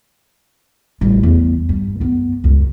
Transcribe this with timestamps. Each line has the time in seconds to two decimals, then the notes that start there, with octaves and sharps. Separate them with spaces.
1.01 A1 G3
1.23 E2
1.69 G2
2.00 F#2 B3
2.44 C#2 F#2